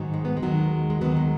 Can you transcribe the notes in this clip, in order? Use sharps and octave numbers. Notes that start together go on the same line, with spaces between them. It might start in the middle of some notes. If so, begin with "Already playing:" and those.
Already playing: G#2 D#3 F#3
G#3
B3
G#3
D#2 D#3 F#3
G#3
D#2 D#3 F#3 B3
G#3